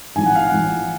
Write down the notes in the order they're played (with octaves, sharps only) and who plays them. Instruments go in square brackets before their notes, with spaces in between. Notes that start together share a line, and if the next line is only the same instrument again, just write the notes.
[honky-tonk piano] A1 G#2 F3 [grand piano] G#5
[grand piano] F#5
F5
F#5
[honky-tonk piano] A1 G#2 F3